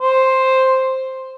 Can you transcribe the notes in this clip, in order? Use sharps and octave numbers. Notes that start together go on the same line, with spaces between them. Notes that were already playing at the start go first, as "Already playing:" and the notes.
C5